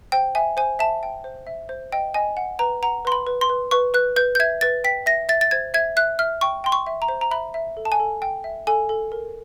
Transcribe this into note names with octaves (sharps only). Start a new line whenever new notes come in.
C5 G5
E5 G#5
C5 G#5
E5 A5
G5
C5
E5
C5
D#5 G5
D#5 G#5
F#5
B4 A#5
F#5 A#5
B4 C6
B5
B4
C6
B4
B4 C#6
B4 F#6
B4 G6
G6
E5 G#6
B4 A6
G5 B6
E5 A#6
E5 A6
A6
C5 G#6
E5 G#6
E5 F#6
E5 F6
G5 C#6
G5 C6
C#6
E5
A#5
C5
A#5
E5 B5
E5
A4
A5
G#5
A4
G5
E5
A4 G#5
A4
A#4